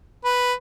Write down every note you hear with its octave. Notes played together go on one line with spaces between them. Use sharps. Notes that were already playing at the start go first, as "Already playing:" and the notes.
B4